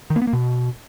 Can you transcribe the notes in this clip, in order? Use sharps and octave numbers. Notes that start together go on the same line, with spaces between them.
D#3
A#3
B3
A#3
B2